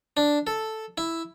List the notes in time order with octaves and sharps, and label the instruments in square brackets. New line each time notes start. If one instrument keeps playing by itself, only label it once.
[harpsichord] D4
A4
E4